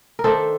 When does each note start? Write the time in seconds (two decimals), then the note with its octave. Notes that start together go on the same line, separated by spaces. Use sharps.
0.19 A#4
0.24 D#3 A3 D4 A4 C5